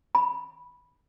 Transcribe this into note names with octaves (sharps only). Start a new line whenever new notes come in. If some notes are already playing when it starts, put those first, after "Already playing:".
B5